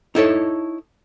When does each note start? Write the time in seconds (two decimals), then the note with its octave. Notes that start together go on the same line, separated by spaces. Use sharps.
0.15 D#4 E4 A4 C#5